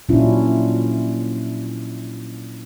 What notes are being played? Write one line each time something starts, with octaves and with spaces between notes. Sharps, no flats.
A#2 F#3 C#4 D4 E4 F4